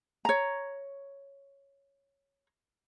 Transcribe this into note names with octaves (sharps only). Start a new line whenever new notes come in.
C#5 A#5